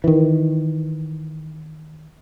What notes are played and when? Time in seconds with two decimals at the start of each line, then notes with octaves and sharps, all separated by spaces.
0.04 D#3 E3